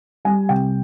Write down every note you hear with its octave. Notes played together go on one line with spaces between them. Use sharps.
G3 G#5
C3 G5